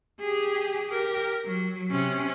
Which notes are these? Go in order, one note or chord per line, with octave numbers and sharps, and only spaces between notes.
G4 G#4
G4 A#4
F#3
C3 C#4